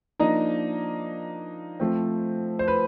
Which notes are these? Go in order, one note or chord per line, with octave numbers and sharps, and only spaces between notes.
F3 A#3 D4 D#4 D#5
F3 A3 C4
C5
B4